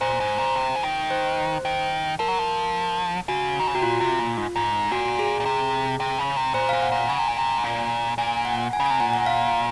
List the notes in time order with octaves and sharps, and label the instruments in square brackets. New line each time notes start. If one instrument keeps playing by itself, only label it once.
[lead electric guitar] A#2 [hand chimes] C5
[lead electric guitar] G#2
A#2
C3
C#3
D#3
[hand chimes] C5
[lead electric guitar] D#3
[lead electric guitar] F3 [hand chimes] A#4
[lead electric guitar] F#3
F3
[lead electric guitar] C#3 [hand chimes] F#4
[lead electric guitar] D#3
C#3
[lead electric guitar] C3 [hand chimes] F#4
[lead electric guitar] A#2 [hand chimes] F4
[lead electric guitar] C3
A#2
G#2
G#2
[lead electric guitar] A#2 [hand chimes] F#4
[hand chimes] G#4
[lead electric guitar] A#2
C3
C3
C#3
C3
[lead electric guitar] A#2 [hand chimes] C5
[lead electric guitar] A#2 [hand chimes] F5
[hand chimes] F#5
[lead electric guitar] A#2
[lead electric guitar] C#3 [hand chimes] G#5
[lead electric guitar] C3
A#2
C3
G#2
A#2
[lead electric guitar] A#2 [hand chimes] G#5
[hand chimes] F#5
G#5
[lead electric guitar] C#3
[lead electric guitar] C3 [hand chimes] G#5
[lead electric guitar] A#2 [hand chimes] F#5
[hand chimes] F#5
F5